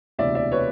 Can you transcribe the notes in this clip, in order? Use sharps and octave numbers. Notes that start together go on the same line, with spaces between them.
E1 D2 C3 E3 D5 E5
D5 E5
B4 C#5